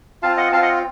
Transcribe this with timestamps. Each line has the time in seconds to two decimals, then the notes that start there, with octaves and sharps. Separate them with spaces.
0.22 C4 F4 F5 A5
0.37 D#5 F#5
0.52 C4 F4 F5 A5
0.62 D#5 F#5